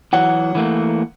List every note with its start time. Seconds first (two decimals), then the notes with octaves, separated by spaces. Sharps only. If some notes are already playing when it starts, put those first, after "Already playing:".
0.13 E3 F#3 F#4 F#5
0.55 E3 A3 A#3